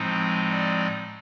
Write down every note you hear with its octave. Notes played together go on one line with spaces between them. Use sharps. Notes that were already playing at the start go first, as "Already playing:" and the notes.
Already playing: A2 F3 G#3 C4 D#4
D5